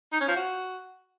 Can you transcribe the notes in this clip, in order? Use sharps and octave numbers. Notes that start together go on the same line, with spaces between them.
D#4
C#4
F3
F#4